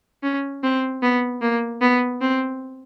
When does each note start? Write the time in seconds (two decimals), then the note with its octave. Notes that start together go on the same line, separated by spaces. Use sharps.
0.23 C#4
0.63 C4
1.02 B3
1.42 A#3
1.81 B3
2.22 C4